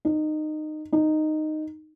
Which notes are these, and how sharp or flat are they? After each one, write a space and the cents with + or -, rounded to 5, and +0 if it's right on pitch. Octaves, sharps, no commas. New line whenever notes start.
D#4 -20
D#4 -10